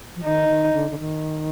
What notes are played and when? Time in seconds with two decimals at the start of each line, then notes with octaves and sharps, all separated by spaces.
0.15 F3
0.25 D#3 D#4
0.49 D#3
0.73 D3
0.91 D3
0.99 D#3